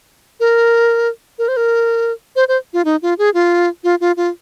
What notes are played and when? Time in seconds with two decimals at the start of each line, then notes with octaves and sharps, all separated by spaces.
0.40 A#4
1.39 A#4
1.48 C5
1.57 A#4
2.36 C5
2.48 C5
2.73 F4
2.85 D#4
3.02 F4
3.18 G#4
3.34 F4
3.84 F4
4.01 F4
4.17 F4